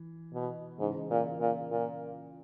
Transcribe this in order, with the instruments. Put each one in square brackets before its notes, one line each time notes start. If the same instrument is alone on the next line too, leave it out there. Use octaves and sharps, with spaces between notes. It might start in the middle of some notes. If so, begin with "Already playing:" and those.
Already playing: [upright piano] E3
[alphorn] B2
[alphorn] G#2 [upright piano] C#3 E3
[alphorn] A#2
A#2
A#2